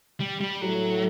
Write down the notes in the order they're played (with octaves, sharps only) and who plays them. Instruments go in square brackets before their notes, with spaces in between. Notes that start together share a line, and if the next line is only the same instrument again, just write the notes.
[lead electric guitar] G3
G3
[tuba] A2 [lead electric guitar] F#3